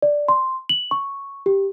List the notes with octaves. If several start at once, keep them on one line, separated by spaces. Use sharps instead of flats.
D5
C6
F#7
C#6
G4